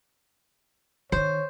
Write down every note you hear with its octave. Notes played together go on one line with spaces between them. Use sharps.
D3 D#3 C5 C#5